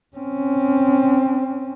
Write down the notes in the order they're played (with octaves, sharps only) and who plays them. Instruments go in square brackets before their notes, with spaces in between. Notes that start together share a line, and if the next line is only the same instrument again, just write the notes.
[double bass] C4 C#4